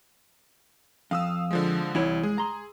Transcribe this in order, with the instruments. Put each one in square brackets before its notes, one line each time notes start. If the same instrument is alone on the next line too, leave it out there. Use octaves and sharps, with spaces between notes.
[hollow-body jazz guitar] F2 [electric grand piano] F5 D#6 E6
[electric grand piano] D3 F3 G#3
[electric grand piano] C2 [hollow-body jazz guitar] E3 E4 C#5
[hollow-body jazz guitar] G#3 [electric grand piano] G#4
[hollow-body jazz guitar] A#5 C6